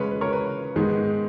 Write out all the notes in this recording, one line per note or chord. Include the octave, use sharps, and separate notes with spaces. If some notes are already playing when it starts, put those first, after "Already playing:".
Already playing: C#3 G#3 C#4 B4
B4
A#4 C#5
B4
G#2 D#3 G#3 B3